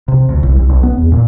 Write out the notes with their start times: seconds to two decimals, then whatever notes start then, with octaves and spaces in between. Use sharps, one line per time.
0.08 C3
0.29 D2
0.43 C2
0.56 C2
0.69 B1
0.83 B3
0.98 E2
1.12 A#2